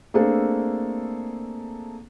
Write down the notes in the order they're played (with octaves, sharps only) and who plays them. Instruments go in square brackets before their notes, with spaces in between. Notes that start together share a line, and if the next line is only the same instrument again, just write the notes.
[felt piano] A3 A#3 C4 D4 G#4 A4